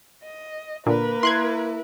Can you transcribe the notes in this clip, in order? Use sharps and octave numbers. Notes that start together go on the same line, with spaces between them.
D#5
A#2 D3 A#3 A#4 B4
E4 C6 F#6 G#6